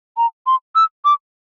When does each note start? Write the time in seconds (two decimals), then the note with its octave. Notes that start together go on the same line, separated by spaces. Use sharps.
0.17 A#5
0.46 C6
0.75 E6
1.05 D6